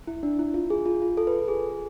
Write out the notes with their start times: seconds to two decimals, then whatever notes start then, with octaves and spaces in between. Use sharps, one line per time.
0.07 E4
0.23 D4
0.39 E4
0.54 F4
0.70 G#4
0.86 F4
1.02 F4
1.17 A4
1.27 B4
1.32 A4
1.48 G#4